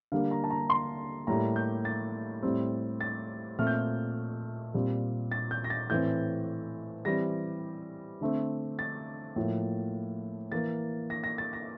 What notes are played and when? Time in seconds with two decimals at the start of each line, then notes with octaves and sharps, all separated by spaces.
0.12 D3 G3 A#3 F5
0.31 A#5
0.44 A5
0.50 A#5
0.70 C6
1.27 A2 G3 A#3 A#5
1.56 G6
1.85 A6
2.43 A2 G3 C4
3.01 A6
3.59 A#2 A3 C4 F6
3.67 G6
3.74 F6
4.74 A#2 G3 C4
5.32 A6
5.51 G6
5.64 A#6
5.70 A6
5.90 A2 E3 A3 C4 G6
7.05 E3 G3 C4 A#6
8.21 D3 A3 C4
8.79 A6
9.36 A2 F3 A#3
10.52 E3 A#3 A6
11.10 A#6
11.24 A#6
11.38 A6
11.53 A#6